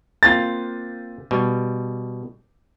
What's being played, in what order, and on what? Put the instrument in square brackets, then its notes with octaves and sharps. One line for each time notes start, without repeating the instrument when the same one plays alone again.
[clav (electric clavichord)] A#3 C4 F4 [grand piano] A6
[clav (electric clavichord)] B2 G3